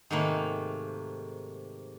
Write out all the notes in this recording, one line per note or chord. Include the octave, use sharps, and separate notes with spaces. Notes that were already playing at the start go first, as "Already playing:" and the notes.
G#2 C3 D#3 A3 A#3 B5